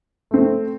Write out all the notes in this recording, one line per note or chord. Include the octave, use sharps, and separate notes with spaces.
A3 C4